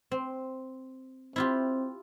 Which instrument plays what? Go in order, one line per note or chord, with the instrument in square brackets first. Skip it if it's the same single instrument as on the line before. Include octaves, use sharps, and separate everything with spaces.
[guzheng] C4
[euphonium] C4 [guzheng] E4 F4 G4